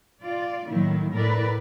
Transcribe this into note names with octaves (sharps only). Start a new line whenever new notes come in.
F4 D5
A2 D#3 F#3 A#3 E4
A2 A3 E4 A#4 B4 D5